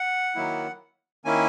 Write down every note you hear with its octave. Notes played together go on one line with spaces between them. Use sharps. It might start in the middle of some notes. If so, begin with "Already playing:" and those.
Already playing: F#5
D#3 F#3 A#3 E4
D#3 A#3 C#4 E4 G#5